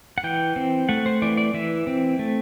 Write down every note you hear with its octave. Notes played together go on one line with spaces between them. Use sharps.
F#5
E3 G5
C4
A3 F#5
C5
E3 D5
D5
E3 E5
C4
A3